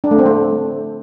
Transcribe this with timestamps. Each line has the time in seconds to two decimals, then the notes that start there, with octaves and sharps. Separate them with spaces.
0.04 D4
0.11 A3
0.18 C4
0.26 A3